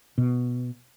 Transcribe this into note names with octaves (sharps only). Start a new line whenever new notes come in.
B2